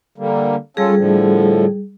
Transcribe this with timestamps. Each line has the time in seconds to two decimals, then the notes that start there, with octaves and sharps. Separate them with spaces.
0.18 D3 G3 A#3
0.77 G3 C#4 F4 G#4 A4
0.97 A2 D3 F3